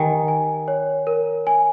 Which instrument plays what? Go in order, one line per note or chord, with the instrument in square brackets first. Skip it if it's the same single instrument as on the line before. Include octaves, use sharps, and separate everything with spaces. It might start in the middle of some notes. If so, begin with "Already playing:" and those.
Already playing: [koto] D#3 [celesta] G4 G#5
[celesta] G#5
C#5
A#4
G#5